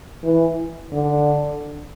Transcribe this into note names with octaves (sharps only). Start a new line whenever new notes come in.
E3
D3